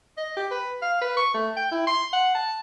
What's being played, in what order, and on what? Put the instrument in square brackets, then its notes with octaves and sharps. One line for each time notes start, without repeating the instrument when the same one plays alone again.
[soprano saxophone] D#5
G4
B4
F5
B4
C#6
A3
G5
E4
C6
F#5
A5